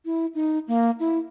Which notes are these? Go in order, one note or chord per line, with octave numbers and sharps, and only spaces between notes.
E4
D#4
A#3
E4